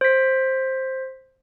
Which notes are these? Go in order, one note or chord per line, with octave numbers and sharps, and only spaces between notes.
C5 B6